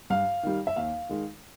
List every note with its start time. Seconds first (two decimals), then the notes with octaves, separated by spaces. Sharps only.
0.10 G2 F5
0.43 D#3 G3
0.67 E5
0.76 D#2 F5
1.09 D#3 G#3